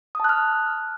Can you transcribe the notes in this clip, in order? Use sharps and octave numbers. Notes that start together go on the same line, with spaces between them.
A5 D#6 F6 F#6